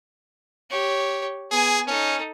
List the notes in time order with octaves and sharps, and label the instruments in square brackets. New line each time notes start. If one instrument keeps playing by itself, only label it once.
[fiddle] G4 C#5
[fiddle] B3 G#5 [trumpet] G#4
[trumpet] C#4 [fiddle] D#4 A4